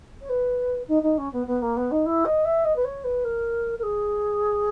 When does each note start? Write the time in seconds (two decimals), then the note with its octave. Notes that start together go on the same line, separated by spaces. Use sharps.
0.21 C#5
0.29 B4
0.88 D#4
1.02 D#4
1.17 C#4
1.32 B3
1.47 B3
1.62 A#3
1.76 B3
1.91 D#4
2.05 E4
2.25 D#5
2.45 E5
2.64 D#5
2.76 B4
2.84 C#5
3.04 B4
3.24 A#4
3.78 A#4
3.83 G#4